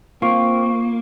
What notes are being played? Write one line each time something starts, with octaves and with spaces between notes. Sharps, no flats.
A#3 C4 F4 C#6